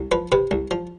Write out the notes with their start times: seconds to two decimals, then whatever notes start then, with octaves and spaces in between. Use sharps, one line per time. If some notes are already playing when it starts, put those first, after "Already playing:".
Already playing: C2
0.12 F3 B4
0.32 C3 B4
0.51 C2
0.71 F3